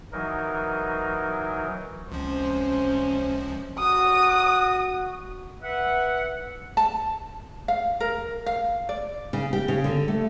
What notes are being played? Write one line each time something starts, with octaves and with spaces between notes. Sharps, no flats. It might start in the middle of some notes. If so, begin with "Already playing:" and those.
E3 F#3 D#4 A#4
C#2 C3 F3 C#4 C5
F#4 D#6
B4 E5 F#5
A5
F5
A#4
F5
D5
C#3
G4
C#3
D3
A3